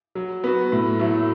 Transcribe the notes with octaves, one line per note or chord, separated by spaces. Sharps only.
F#3
B3 F#4
A2
F#3 A3 E4